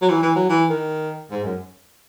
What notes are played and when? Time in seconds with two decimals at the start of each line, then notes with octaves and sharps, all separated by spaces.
0.02 F#3
0.09 E3
0.22 E3
0.35 F#3
0.49 E3
0.69 D#3
1.31 G#2
1.44 F#2